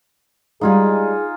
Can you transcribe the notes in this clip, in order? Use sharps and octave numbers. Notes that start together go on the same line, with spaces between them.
G3 G#3 D#4 F4 G#4 F5 G#5